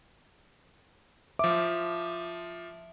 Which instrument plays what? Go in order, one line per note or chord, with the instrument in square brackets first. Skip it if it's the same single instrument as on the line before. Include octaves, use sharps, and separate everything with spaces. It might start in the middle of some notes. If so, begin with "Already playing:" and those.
[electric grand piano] F3 D6 [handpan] E5